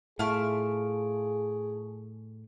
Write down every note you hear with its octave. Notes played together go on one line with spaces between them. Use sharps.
A2 F4 G#4 E5 A5 C#6 F6 D7